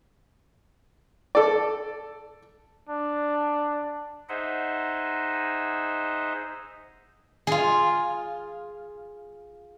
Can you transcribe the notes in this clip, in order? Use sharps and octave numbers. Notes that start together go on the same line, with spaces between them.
A4 D5
D4
D#4 G#4 C5 D#5 E5 F#5
F4 G#4